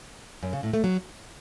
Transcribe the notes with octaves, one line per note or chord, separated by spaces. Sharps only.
F#2
C#3
A2
A3
F#3